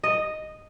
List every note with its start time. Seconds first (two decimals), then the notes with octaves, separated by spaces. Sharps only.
0.04 D#5